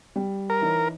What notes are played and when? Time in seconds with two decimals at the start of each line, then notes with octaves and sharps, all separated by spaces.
0.16 G3
0.50 A#4
0.61 E3 D#4 C#5